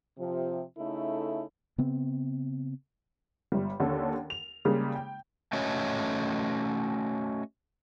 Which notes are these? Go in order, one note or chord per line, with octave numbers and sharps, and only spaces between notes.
C3 F3
C#3 A3 D#4 E4 A4
C#3 B3 C4
G1 G3
D#2 D3 C#4 A4
F7
C#3 G3 G#3 A#3
G5
A3 C#4 F#4 A4 C#5 D#5